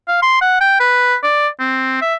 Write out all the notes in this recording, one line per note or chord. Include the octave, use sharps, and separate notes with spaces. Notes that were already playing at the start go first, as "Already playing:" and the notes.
F5
C6
F#5
G5
B4
D5
C4
E5